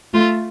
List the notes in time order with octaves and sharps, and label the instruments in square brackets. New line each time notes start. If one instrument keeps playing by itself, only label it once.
[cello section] A3 [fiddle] F4